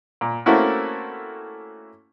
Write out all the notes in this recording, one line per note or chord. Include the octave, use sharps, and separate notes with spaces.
A#2
A3 A#3 C4 C#4 E4 F#4